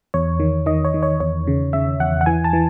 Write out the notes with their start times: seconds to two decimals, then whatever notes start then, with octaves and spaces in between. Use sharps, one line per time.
0.14 E2 C#5
0.40 D#3
0.66 D#3 D#5
0.85 C#5
0.94 D#3
1.03 C#5
1.20 E2 C#5
1.47 C#3
1.73 C#3 E5
2.00 E2 F#5
2.21 F#5
2.26 E3 G#5
2.44 A5
2.53 E3